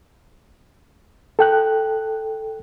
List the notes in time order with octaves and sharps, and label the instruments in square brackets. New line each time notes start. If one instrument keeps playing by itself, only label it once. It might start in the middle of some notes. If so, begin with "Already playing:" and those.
[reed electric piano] A4 G5 F#6